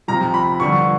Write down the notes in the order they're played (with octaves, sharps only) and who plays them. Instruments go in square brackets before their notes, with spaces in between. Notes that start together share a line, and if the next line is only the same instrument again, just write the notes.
[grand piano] F2 C3 F3 A#5
B5
G2 D3 F3 C#6